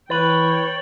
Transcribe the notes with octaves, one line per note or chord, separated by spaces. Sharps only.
E3 B4 C#5 G5 A6 F#7